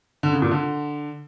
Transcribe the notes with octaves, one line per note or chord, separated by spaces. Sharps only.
D3
C#3
A#2
D3